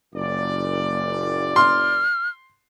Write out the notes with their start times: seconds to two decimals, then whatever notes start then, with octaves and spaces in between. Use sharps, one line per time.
0.14 F#1 A#2 D5
1.56 C6 F6